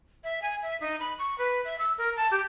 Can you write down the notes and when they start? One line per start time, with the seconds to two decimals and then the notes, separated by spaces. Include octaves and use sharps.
0.24 E5
0.42 G#5
0.62 E5
0.81 D#4
1.00 B5
1.19 C#6
1.38 B4
1.65 E5
1.79 E6
1.98 A#4
2.16 A5
2.31 G4